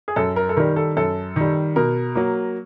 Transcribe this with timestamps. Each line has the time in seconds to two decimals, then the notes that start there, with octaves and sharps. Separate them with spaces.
0.08 G#4
0.16 F#2 A4
0.36 A#4
0.49 A4
0.57 D#3 G3 A#4
0.76 A4
0.97 F#2 A4
1.36 D#3 G3
1.76 B2 A#4
2.15 F#3 A#3